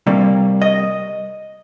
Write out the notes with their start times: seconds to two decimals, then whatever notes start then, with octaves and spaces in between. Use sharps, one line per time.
0.07 C3 G3 A#3
0.62 D#5